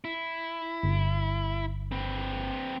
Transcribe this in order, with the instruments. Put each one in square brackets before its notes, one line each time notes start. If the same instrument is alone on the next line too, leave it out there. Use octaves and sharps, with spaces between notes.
[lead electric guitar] E4
[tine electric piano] G1
[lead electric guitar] C4 B4